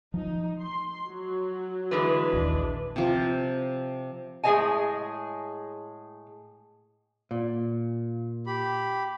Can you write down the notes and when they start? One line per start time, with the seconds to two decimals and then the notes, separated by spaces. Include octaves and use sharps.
0.14 F3 D#4
0.59 C6
1.08 F#3
1.91 D3 E3 G#3 B4
2.33 A#1 D#2 D4
2.96 C3 F3
4.44 A2 G#3 G#4 C#5 D#5 G#5
7.31 A#2
8.47 G4 B5